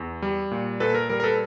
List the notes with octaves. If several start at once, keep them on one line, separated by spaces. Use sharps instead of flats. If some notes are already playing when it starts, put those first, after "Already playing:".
Already playing: E2
G3
A#2
A#2 A4 B4
A#4
G3 A#4
A#4
A4 B4